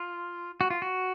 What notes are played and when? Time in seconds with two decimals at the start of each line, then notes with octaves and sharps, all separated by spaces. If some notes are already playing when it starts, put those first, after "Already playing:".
Already playing: F4
0.61 F#4
0.70 F4
0.82 F#4